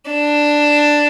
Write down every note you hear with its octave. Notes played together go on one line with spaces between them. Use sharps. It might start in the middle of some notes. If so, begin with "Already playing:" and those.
D4